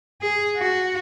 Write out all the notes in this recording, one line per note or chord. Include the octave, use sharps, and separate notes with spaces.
G#4
F#4